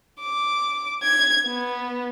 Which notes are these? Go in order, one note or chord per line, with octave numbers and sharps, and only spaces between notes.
D6
G#6
B3